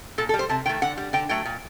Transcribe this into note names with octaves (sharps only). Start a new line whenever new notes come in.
A#2 A4
A4
G3
C5
C3 A5
D#3 A3 G5
D3 F#5
G3
D3 G5
F#3 A3 G5
A#2